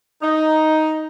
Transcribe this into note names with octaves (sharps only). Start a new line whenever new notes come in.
D#4